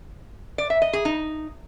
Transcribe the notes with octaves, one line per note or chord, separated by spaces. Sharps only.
D5
E5
D#5
G#4
D#4